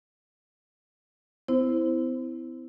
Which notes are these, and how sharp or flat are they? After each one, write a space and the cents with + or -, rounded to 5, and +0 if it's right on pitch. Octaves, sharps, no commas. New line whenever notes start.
C4 -45 E4 -10 C5 +0